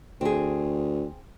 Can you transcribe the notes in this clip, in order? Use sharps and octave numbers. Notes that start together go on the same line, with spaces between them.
D2 C4 G#4